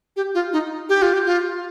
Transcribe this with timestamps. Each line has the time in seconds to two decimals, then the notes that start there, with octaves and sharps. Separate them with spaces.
0.16 G4
0.35 F4
0.53 D#4
0.89 G4
1.02 F4
1.14 G4
1.26 F4